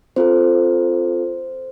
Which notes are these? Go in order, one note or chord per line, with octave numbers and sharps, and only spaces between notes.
C4 F4 A4 C5